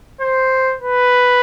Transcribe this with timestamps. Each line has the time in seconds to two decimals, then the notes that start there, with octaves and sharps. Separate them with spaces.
0.21 C5
0.81 B4